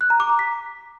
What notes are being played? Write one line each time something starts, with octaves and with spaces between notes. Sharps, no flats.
F#6
A#5
D6
A#5
B6